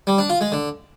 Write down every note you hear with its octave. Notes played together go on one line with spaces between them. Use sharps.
G3
D4
F4
G#3
D3